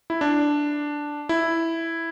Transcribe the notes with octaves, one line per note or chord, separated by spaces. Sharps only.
E4
D4
E4